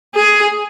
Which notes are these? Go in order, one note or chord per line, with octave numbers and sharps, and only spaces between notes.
G#4